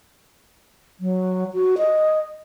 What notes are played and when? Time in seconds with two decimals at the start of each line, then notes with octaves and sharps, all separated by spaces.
1.00 F#3
1.54 F#4
1.78 D#5